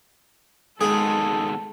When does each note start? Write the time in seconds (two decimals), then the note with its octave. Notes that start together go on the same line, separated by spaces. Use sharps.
0.81 G#2 B2 D#3 G#3 G#4 A4